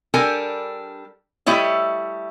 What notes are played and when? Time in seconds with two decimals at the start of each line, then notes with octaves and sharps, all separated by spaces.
0.14 G3 D4 A4 A#4 G#5
1.46 G3 A3 E4 C#5 D#5